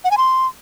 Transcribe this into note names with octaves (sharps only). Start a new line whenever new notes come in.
F#5
G#5
C6